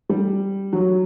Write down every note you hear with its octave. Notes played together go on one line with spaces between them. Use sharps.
G3
F#3